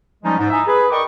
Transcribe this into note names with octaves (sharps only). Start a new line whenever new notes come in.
F3 G3 G#3 C#4 D#4
G#2
D#4 E4 E5 G#5 A#5
G#4 B4
A#4 D5 D#5 G5 C#6 D6